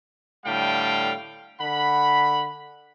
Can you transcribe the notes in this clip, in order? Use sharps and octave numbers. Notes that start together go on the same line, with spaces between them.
A2 D3 G3 F5 G5
D3 F#5 B5